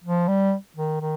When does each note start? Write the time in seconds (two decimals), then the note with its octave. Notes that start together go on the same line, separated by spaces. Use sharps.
0.04 F3
0.28 G3
0.76 D#3
1.01 D#3